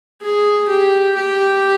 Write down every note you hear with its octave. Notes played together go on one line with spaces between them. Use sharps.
G#4
G4
G4